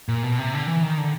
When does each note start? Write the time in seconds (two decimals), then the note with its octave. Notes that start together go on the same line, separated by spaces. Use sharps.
0.09 A#2
0.23 B2
0.38 C3
0.54 D3
0.68 E3
0.83 D#3
0.98 D3